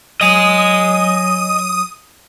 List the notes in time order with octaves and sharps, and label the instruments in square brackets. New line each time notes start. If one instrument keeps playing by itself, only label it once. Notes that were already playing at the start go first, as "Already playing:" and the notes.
[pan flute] F#3 [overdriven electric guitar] D#5 G#5 [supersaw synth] D#6